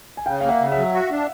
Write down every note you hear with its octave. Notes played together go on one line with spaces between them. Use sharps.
G#5
C#3 F5 G5
A#3 F5
E5 F#5
C#3
E5 F#5
F#3
F#4
D4